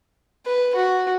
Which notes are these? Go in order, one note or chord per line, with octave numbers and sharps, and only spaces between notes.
B4
F#4